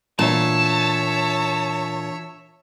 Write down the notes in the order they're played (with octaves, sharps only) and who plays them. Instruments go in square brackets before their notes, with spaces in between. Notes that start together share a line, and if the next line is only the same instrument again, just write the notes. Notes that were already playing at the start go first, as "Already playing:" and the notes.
[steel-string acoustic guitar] A#2 [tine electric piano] E3 D4 [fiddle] C#5 E5 [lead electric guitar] A5